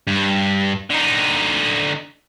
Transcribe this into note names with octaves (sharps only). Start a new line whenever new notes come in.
G2
D3 D#4